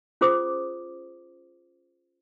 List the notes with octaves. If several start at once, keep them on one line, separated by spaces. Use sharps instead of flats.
C#4 F4 G#4 C5 D6 D#6